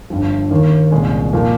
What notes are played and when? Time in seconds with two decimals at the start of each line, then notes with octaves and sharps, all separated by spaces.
0.10 G1 G2 F3
0.51 D#2 D#3 A#3
0.91 C2 A#2 G#3 C#4
1.33 A#2 F3 A#3